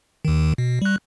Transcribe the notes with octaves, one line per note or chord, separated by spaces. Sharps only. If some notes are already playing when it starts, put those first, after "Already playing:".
D#2 D#3
B2
G3 F#6